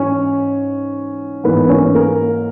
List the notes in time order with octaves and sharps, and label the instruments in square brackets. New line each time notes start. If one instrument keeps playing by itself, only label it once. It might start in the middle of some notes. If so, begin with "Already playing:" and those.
Already playing: [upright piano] G#2 E3 C#4 C#5
G#2 E3 A#3 B3 B4
C#4 C#5
A#3 A#4